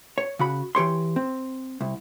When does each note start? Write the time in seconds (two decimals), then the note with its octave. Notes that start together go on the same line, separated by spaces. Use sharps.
0.18 C#5
0.39 C#3 F#4 B5
0.75 E3 G4 C#5 C6
1.16 C4
1.81 C2